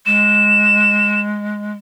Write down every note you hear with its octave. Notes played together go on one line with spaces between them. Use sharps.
G#3 E7